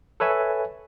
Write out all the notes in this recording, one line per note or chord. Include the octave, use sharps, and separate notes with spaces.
A4 B4 C#5 E5 G#5